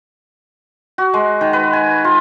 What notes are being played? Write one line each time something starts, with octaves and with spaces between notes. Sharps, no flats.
F#4
G#3
D#3
B4
G#5
F4